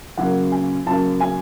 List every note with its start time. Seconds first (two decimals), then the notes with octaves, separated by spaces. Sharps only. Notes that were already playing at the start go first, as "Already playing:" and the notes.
0.17 F#2 C#3 F#3 A#3 F#5
0.52 G#5
0.86 F#2 C#3 F#3 A#3 A5
1.20 G#5